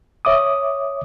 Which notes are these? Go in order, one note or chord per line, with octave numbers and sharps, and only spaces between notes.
C#5 E5 D6 D#6